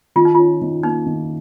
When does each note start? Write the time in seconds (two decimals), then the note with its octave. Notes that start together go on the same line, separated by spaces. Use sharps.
0.16 D#3 F4
0.25 D#4
0.35 C#4 F4
0.62 D#3
0.83 A#3 D#4
1.06 D#3